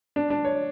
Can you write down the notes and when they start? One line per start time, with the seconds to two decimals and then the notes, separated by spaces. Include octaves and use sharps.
0.16 D4
0.30 D4
0.45 C#5